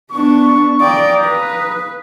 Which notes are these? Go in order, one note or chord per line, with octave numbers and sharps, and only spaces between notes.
B3 D4 C#6
D5 F5 G5 A#5 D#6
B4